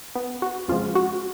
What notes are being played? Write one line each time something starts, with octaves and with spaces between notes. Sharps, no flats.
B3
F#4
F2 C#3 F3 G#3 F4
F#4